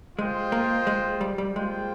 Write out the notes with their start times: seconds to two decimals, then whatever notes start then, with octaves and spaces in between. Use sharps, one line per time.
0.18 G#3 F4 C5 D#5 G5
0.52 A#3
0.87 G#3
1.21 G3
1.38 G3
1.56 G#3 A#3 F4 C5 G5